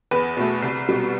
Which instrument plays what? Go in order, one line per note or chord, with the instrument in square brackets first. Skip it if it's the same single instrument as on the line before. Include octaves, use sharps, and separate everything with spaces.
[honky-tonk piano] E2 B4
B2 A3
C2
B2 G3